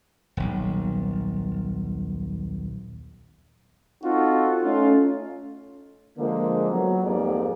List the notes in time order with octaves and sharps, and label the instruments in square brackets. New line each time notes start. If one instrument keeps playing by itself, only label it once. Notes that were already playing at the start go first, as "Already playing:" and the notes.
[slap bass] D#1 B1
[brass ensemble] C4 D#4 F4 F#4 A4
A3 C#4 D#4 F4
[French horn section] D3 F3 G#3 A#3
F#3 B3
F2 G#2 A#3 G4 G#4 D5